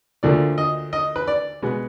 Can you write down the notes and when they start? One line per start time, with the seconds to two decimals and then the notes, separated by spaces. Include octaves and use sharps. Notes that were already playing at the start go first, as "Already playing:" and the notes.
0.23 D2 D3 F3 A#3 D5
0.58 D#5
0.93 D#5
1.16 B4
1.28 D5
1.63 B2 G#3 B3